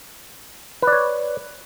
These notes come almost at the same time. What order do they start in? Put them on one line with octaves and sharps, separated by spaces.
B4 D5 C#5